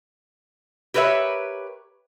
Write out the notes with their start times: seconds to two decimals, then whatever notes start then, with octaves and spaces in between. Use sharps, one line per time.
0.94 G4 A#4 B4 C#5 E5